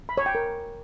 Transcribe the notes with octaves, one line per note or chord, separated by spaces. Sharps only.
B5
C#5
G5
A#4